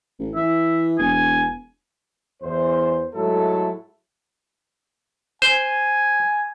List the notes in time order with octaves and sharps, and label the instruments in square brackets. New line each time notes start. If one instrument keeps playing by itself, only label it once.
[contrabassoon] A1
[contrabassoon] E3 [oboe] E5
[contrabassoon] E1 [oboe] G#5
[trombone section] E2 C5
G#2 F#3 G#3 A3 E4 A4
[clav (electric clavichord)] C5 [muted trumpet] G#5